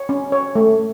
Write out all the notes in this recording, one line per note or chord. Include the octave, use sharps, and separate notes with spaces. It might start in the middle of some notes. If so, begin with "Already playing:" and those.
Already playing: C#5
C#4
C#5
A3